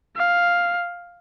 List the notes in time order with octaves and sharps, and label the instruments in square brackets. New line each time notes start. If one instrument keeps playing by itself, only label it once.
[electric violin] F5